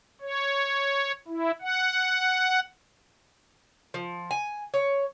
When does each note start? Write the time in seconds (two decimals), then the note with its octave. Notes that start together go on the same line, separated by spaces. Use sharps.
0.21 C#5
1.28 E4
1.62 F#5
3.94 F3
4.31 G#5
4.74 C#5